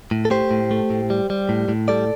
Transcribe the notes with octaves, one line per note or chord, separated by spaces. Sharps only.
A2
A4
A3 G4 C5
A2
A3
A2
G3
G3
A2
A2
G3 A4 D5